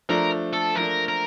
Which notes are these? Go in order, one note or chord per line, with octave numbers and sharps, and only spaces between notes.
F3 A3 D4 A#4
A4
F3 A3 D4 A#4
A#4